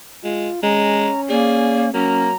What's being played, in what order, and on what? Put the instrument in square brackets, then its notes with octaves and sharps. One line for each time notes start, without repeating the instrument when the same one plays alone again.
[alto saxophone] G#3 [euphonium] F4
[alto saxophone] G#3 [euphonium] C#4 [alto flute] A#5
[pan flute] A#3 [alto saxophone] G#4 [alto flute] D5
[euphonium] F#3 [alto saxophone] A#3 [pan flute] C#4 [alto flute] A#5